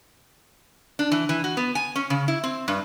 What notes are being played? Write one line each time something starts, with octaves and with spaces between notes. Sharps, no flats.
D4
E3
E3
F#4
B3
G#5
C#4
C#3
E4
C4
G2